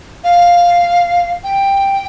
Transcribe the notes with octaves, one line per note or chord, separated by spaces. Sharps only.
F5
G5